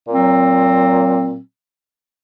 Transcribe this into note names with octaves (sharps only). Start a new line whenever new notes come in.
A#2 F#3 C4